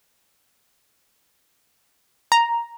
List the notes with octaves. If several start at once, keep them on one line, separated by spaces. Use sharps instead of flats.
A#5